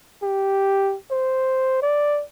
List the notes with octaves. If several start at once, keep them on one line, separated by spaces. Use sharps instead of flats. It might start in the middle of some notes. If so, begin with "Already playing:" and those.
G4
C5
D5